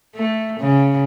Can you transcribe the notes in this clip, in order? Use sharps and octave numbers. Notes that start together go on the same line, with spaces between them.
A3
C#3